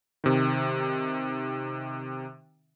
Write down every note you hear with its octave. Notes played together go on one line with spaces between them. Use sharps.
C3 D#3